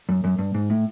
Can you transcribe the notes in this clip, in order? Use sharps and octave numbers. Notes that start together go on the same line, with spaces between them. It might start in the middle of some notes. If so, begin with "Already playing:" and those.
F#2
F#2
G2
G#2
A2